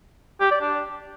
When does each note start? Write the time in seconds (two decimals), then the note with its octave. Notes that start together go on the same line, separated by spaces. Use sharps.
0.41 G4
0.51 D5
0.61 D4